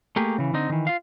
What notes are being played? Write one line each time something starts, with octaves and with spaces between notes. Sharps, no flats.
A3 A#3 G4 G#4
C#3 E3
D3 C4 D#4
D#3 E3
F4 F5